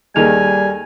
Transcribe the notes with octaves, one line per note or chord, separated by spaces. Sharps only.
D#2 D#3 G3 G#4 A4 G#5 F7